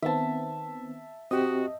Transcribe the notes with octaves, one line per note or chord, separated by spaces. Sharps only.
D#3 B3 C4 E5 A5
C4 F#4 G4 D#5